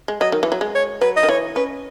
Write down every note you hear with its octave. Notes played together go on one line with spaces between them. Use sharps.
G#3
F#3 D#5
D#3
E3
F#3
G#3
C#5
F#3 B4
D#5
D#3
E3 C#5
C#4 B4